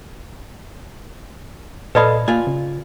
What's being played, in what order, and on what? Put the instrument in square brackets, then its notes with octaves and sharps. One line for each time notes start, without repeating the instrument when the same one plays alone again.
[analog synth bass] A#2 [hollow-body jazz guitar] A4 D#5 F5 [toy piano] B4 D5 B5
[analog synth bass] A#3 [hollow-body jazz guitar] F4 G#5
[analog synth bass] C#3